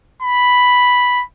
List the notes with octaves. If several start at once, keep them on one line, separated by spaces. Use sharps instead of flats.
B5